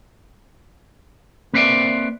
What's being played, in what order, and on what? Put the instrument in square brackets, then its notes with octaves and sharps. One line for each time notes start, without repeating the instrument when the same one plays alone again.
[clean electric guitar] A#3 C4 B4 C5 D5 E5